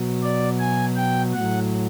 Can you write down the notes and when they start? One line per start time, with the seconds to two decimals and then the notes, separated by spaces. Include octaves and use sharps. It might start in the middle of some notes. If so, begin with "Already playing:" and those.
Already playing: B2 F#3
0.23 D5
0.59 G#5
0.96 G5
1.33 A2 F#3 F#5